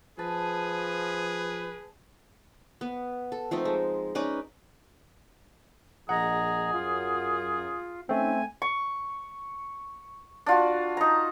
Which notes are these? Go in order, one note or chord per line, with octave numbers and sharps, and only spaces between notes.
F3 G#4 B4 A5
B3
A4
F3 A3 C4 D#4
G#3
C#4 D#4 B4 D5
A#1 F3 G#4 D#5 F#5 A#5
F#2 F4
A3 C4 C#4 D#4 G#5
C#6
D4 F4 F#4
D#4 A#5